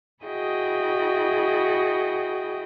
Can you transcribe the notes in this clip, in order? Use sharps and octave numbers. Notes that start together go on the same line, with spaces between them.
E4 F#4 G#4 D#5 G5